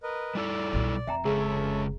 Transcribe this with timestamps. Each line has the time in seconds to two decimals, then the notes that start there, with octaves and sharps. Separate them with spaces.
0.03 A#4 B4 D#5
0.35 G3 E4 A4 D5
0.73 B1 B2
1.07 F1 E5 G5 A#5
1.25 C#3 G#3 G#4 A4 C#5 E5